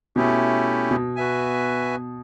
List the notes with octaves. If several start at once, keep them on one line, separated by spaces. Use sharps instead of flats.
B2 A3 C#4 E4 G4
B2
F#4 B4 E5 G#5